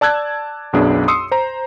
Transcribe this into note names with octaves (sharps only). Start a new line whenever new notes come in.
D5 A5 E6 F#6 G#6
B1 F#2 B3 D4 G#4
C6 D#6 E6 C7 C#7
C5 A#5